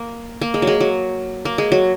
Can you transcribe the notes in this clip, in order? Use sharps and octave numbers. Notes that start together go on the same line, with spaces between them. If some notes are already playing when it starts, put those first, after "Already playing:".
Already playing: A#3
A#3
G#3
F#3
G#3
F#3
A#3
G#3
F#3